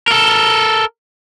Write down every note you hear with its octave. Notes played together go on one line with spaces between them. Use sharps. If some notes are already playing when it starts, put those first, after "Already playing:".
A4 A#4